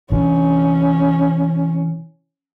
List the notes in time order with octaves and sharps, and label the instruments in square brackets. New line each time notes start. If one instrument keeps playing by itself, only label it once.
[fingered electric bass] C3 E3 D4 [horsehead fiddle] C#4